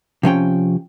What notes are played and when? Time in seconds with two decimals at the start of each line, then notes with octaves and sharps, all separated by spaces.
0.23 C3 F3 C#4 G5